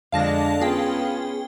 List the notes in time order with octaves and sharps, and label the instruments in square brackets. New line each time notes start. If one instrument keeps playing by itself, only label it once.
[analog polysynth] F2 D3 D4 [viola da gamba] G#3 [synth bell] F5 A5 A#6
[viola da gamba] B3 C#4 [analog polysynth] F4 [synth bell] G#4 G5